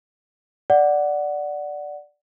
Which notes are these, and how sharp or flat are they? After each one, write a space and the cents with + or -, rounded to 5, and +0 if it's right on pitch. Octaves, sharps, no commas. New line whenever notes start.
D5 +0 F#5 +0